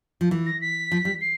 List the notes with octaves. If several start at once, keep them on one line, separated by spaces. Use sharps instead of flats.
F3
E3
A#6
B6
F3
G3
C7